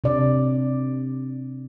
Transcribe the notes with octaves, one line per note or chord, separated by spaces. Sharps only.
C3 D4 D5